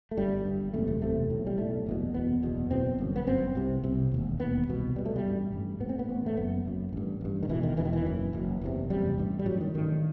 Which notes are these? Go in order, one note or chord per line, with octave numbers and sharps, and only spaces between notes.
A3
G1 G2 G3
G1 G2
F#1 E2 C3 A3
A3
F#1 E2 C3 A3
B1 A2
G3
B1 A2 A3
F#1 E2 B2
F#1 E2 B2 B3
F#1 E2 B2
F#1 E2 B2 C4
G1 F#2
B3
G1 F#2 C4
C2 C3
C2 C3
E1 D#2
E1 D#2 B3
C2 B2
C2 B2 G3
A3
G3
A1 G2
A1 G2
A1 A2 B3
C4
B3
A1 A2
A3
F#1 F#2 B3
F#1 F#2
A1 G2
A1 G2
D#3
E1 E2 B2 E3
D#3
E1 E2 B2 E3
D#3
E3
F#1 F#2
F#1 F#2
F#1 E2 C3
F#1 E2 C3 G3
A1 G2
G3
A1 G2 F#3
D#3
A1 G2 D#3